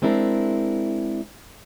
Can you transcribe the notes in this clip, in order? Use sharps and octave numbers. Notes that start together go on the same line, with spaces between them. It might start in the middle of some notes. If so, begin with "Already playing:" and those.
G#3 C4 D4 E4 A#4